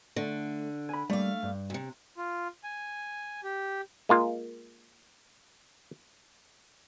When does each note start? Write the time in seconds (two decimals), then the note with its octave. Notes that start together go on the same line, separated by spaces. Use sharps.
0.16 D3 A3
0.89 G#5 B5
1.10 G3 A3 A#3 F5
1.43 G2
1.70 D2 C3
2.17 F4
2.64 G#5
3.44 G4
4.09 G#3 A#3 F4